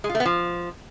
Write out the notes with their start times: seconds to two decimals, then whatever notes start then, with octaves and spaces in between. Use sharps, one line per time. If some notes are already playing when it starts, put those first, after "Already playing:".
0.04 G#3
0.09 F4
0.15 A3
0.20 B3
0.25 F3